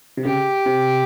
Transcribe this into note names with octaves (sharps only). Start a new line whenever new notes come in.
C3
C#3 G4
C3